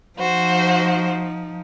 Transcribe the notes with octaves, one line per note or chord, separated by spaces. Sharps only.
F3 D#4 F#4 C5